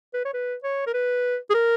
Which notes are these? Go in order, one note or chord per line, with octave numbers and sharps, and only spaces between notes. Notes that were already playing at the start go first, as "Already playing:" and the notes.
B4
C#5
B4
C#5
A#4
B4
G#4
A#4